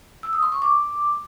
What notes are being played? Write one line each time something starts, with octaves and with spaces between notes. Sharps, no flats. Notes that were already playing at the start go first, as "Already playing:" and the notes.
E6
D#6
C6
C#6
D6